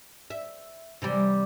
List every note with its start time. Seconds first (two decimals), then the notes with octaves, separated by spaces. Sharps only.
0.30 E5
1.02 C3 E3 G3